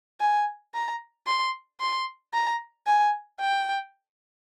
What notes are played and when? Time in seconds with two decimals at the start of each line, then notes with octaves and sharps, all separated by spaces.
0.21 G#5
0.74 A#5
1.27 C6
1.80 C6
2.34 A#5
2.87 G#5
3.40 G5